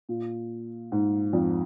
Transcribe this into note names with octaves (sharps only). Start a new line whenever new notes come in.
A#2
G#2
F2